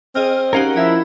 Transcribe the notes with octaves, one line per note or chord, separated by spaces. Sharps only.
C4 G#4 D#5 F6
C#4 D#4 G4 A#4 F5 F#5
F3 E4 D#5 E5